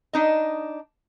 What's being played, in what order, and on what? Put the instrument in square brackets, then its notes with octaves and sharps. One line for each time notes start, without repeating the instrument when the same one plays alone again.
[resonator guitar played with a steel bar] D4 D#4 D#5